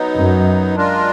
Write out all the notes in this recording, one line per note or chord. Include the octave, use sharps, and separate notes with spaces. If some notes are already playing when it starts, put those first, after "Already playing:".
Already playing: F#3 B3 D#4
F#2
G#3 D4 F4 A#4